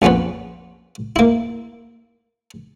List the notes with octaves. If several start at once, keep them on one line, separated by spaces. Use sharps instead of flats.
A#1 F2 B3 C#4 B4
A#3 E4